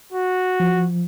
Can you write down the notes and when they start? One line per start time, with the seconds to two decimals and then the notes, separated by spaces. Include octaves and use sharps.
0.12 F#4
0.60 F3